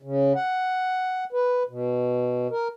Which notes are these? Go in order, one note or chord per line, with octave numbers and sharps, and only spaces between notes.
C#3
F#5
B4
B2
A#4